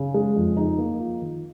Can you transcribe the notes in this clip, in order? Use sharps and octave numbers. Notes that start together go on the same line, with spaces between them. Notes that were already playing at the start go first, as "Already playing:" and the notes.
Already playing: C#3
G#3
F2
D#4
A#3
F4
D#3